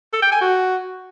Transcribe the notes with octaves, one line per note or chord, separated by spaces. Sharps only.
A4
G5
G#5
F#4